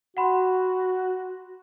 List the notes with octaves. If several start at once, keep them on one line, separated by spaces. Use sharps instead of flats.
F#4 F#5 B5 C6